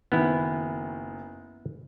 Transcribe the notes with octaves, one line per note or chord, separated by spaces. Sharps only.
F#1 D#3 B3 E4